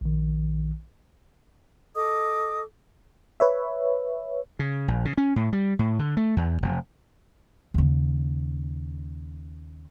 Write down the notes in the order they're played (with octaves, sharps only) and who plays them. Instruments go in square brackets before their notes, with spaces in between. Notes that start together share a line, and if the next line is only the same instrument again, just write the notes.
[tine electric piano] A#1 D#3
[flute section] A4 D#5 D6 D#6
[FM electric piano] B4 C#5 E5
[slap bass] C#3
A#1
C#3
C#4
A2
G3
A2
D3
A3
E2
F1
[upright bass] D#2 C#3